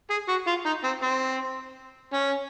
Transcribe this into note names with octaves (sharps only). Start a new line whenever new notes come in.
G#4
F#4
F4
D#4
C4
C4
C#4